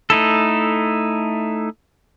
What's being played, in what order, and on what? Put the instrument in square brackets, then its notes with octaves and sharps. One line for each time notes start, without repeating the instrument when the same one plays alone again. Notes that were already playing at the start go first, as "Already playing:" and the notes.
[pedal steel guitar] A3 D#4 E4 A4